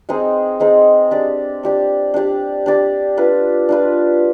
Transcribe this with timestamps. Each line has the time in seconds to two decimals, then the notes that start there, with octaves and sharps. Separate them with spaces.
0.09 G#3 C4 D#4 G#4
0.60 G#3 C4 D#4 G#4
1.11 D4 G4 D5
1.63 D4 G4 D5
2.14 D4 G4 D5
2.66 D4 G4 D5
3.17 D4 F4 B4
3.69 D4 F4 B4